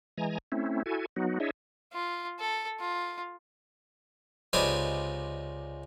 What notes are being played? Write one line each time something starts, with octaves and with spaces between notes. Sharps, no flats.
E3 G#3 G#5 A#5
A3 C4 C#4 E4
E4 F#4 A4 G#5
F#3 B3 D#4 F#4
D4 E4 G#4 C#5 D#5 E5
F4
A4
F4
C#2 C3 D4 D#4 B4 G#5